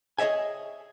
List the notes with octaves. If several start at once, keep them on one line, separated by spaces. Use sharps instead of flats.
G#4 C#5 D#5 E5 G#5